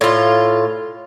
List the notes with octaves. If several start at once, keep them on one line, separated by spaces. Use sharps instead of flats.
A2 F4